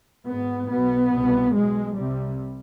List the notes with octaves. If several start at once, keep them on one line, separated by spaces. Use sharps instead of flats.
G#1 G#2 B3
B1 B2 B3
C2 B2
B1 B2 G#3
C2 C3 G3